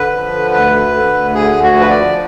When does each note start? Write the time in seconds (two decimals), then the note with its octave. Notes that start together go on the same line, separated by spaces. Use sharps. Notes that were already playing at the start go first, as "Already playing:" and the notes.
Already playing: D3 B4
0.11 F3
0.32 D3
0.53 D2 B4
0.73 D3
0.94 D3
1.14 D2
1.35 D3 G#4
1.55 D2
1.63 F#4
1.76 F3
1.81 B4
1.90 D5
1.97 F3